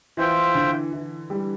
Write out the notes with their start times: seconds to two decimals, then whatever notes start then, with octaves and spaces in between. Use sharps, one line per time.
0.17 E3 F4 C5 E5 G5
0.55 D3
0.93 E3
1.30 G3